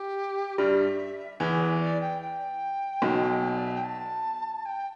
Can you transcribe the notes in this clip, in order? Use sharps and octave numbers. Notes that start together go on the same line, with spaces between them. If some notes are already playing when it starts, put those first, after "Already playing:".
Already playing: G4
G2 G3 E5
E2 E3 E5
B4
D5
G5
G5
B1 B2
D5
E5
G5
A5
G5